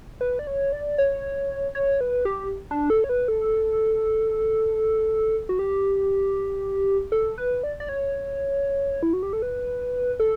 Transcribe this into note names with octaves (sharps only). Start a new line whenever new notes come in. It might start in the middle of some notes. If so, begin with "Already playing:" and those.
B4
D5
C#5
D5
C#5
C#5
B4
G4
D4
A4
C#5
B4
A4
F#4
G4
A4
B4
D5
D5
C#5
E4
F#4
G4
A4
B4
A4